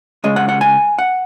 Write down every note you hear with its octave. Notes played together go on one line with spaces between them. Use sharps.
C#2 C#3 G#3 D#5
F#5
F#5
G#5
F#5